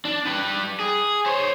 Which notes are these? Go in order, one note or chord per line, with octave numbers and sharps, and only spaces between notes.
D4
G3 B4
G#4
C5 C#5